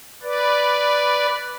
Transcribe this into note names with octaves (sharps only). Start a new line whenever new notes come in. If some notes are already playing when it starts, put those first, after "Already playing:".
B4 D5